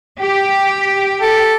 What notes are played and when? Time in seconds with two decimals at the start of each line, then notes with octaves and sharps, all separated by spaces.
0.20 G4
1.22 A4